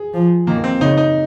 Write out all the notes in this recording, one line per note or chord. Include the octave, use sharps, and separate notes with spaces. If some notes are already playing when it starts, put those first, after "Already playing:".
Already playing: G#4
F3
D#3 A#3
C4
C#3 D#4
D#4